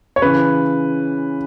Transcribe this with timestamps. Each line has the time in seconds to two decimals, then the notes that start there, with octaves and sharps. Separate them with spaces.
0.16 C#5
0.22 C#3 E3 B4